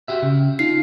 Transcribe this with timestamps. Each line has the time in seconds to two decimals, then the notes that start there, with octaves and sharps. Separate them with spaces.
0.08 F#4 G4 E5
0.22 C#3
0.59 D#4 F4 C7